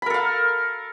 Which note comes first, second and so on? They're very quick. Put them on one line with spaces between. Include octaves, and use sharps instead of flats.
B5 A#4 A4 F5